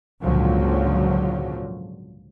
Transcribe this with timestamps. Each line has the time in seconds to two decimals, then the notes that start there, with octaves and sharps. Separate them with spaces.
0.21 G#1 C#2 A#2 D3 F3 F#3